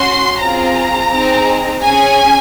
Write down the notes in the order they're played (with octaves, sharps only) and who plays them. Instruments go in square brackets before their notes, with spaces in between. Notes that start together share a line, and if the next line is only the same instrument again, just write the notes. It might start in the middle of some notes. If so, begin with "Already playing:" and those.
Already playing: [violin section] C#4 F#4 C6
C4 F4 G#4 A#5
C4 D#4 G#4
C#4 G#4 G#5